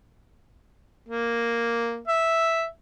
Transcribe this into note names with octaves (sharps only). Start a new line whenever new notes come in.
A#3
E5